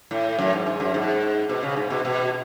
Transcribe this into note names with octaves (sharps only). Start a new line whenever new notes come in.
A2
F#2
G#2
G#2
F#2
G#2
B2
C#3
G#2
B2
B2